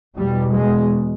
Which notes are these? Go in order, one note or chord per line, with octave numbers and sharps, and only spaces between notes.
E2 B2 G3
G#3